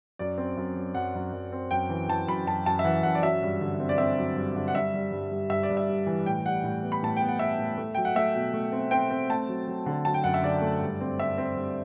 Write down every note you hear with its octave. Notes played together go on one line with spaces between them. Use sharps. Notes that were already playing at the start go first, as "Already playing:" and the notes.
F#2 D5
C4
F#2
F#3
F#2 F#5
F#2
F#2
C4
F#2 G5
E3
E3 A5
F#2 B5
F#2 A5
F#2 A5
E5
E3 F#5
F#2 F#5
D5
F#3 E5
G2
D3
C4
D5
C4 E5
F#3
G2
D3
F#5
G2 E5
G3
G2
G3
G2 E5
D5
G2
E5
G3
E3
A2 G5
G3 F#5
A2
B3
B5
A2 A5
B3 G5
F#5
B3 E5
A2
A3
F#3 G5
F#5
A3 E5
B2
A3
C4
C4 G5
C4
A3 A5
F#3
F#3
D3
F#3 A5
G5
F#2 F#5
E5
D3 D5
A3
G2
C4
C4 E5
C4
G2